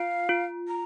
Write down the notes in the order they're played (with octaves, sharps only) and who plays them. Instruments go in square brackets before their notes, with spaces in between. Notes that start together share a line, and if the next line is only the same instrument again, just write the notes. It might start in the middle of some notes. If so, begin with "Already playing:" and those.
Already playing: [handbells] F4 [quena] F5
[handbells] F4
[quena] A#5